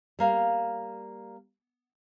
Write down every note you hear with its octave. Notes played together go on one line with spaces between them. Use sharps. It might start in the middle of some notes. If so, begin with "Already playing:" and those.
G3 A#3 F5